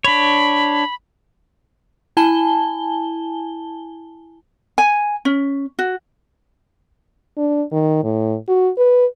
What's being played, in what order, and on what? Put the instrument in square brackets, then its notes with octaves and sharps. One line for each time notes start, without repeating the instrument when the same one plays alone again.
[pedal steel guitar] D4 C#5 [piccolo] B5
[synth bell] E4 G#5 A5 G7
[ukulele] G#5
C#4
F#4
[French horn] D4
D#3
A2
F#4
B4